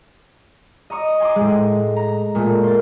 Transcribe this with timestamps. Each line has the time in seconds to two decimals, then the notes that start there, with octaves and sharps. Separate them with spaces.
0.90 D#5 A#5 C#6 D#6
1.20 G#5 C6 D6
1.36 A2 G#3
1.96 A#5
2.35 A#2 G#3 A3
2.64 C6 A6